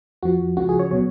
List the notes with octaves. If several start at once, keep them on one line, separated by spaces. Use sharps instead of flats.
F2 F3 F#4
C#2 C#3 F3 F#4
G#4
C#5
B2 F#3 C#5